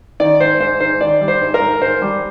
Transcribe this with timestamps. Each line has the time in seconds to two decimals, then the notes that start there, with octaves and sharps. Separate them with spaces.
0.20 D#3 D5
0.40 G#2 C5
0.60 G#2 C5
0.80 G#2 C5
1.01 D#3 D5
1.21 G3
1.28 C5
1.41 G#2
1.54 A#4
1.62 G#2
1.81 G#2 C5
2.02 G3